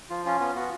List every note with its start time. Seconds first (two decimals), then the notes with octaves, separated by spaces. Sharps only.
0.10 F3 F4
0.26 C#4 F4
0.40 B3 F4
0.55 B3 F#4